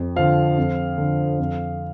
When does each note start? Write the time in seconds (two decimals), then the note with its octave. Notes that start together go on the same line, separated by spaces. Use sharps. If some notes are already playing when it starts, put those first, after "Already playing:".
Already playing: F2
0.16 D3 F3 F5
0.58 F2
0.98 D3 F3
1.39 F2